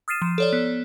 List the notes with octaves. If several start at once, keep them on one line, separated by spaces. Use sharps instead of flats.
D#6 F6 A6 C7 D#7 E7
F3
A4 C#5 D5
B3